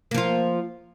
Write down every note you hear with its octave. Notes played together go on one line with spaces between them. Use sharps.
F3 A#3 F4